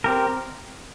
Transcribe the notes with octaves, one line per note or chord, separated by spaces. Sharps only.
C4 G4 A#4